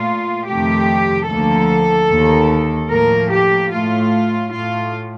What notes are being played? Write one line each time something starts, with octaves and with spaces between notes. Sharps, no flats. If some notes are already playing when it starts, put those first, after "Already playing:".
Already playing: A#2 A3 F4
F2 C3 D#3 A3 G4
D2 D3 F3 A#3 A4
D#2 D#3 A#3
A2 F3 A#3 A#4
G4
A2 A3 F4
A2 A3 F4